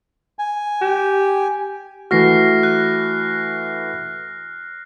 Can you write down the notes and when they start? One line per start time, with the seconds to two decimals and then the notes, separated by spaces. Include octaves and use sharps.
0.39 G#5
0.82 G4
2.11 E3 A3 F#4 F6 A#6 C7
2.63 F#6